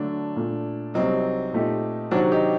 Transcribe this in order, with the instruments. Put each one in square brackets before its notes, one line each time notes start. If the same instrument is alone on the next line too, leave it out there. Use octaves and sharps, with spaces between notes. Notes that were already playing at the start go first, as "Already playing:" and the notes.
Already playing: [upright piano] D3 F#3 A3 [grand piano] D4
[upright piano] A#2 A3 D4
[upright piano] C2 C3 F#3 [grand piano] C4 D#4
[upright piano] A#2 A3 D#4 G4
[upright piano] C3 D#3 F#3 C4 [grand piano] D4 F#4
[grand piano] D#4 G4